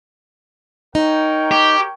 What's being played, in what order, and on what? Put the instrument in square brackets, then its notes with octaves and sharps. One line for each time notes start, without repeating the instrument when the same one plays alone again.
[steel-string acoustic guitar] D#4 [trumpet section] A#4 C#5 G5
[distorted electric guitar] G4